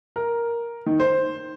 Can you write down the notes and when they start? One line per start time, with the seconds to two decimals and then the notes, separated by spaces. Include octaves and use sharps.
0.16 A#4
0.86 D#3
1.00 C5